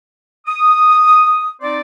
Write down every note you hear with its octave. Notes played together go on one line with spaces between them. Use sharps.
D#6
C4 D#4 C5 D5